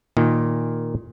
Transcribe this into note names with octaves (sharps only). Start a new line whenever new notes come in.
A#2 D#3